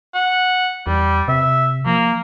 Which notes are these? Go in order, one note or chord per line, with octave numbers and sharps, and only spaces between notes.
F#5
E2 G3
C3 E5
F3 A#3